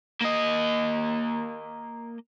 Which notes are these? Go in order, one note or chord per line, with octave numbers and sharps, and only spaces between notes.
A#3 D#5